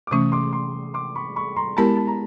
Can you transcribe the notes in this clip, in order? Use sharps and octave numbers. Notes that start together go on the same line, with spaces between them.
D6
C3 E3 A3 C#4 C#6 D#6
C6 D6
C6 D6
C6 D6
B5 C#6
B5 C#6
A#5 C6
G#3 B3 E4 G4 A#4 A5 B5
A5
A#5